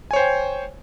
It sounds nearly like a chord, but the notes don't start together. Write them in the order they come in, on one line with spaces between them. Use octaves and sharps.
G#5 C#5 C5 G5